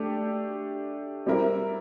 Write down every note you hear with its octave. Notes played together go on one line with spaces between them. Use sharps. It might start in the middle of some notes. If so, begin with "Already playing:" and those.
Already playing: A3 D4 G4
G3 C4 E4 A#4